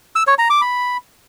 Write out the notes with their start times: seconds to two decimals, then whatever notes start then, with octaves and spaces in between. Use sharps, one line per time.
0.16 E6
0.27 C#5
0.39 A#5
0.50 D6
0.61 B5